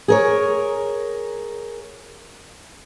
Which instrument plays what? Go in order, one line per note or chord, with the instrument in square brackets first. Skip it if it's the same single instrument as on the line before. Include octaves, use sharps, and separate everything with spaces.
[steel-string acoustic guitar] G#4 A#4 C#5